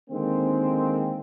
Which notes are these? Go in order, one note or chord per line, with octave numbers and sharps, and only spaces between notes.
D3 D#3 G#3 A#3 C4